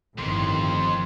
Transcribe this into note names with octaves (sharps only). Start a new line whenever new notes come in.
G1 F2 A2 D#3 C6